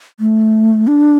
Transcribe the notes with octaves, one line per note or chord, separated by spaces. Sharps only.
A3
D4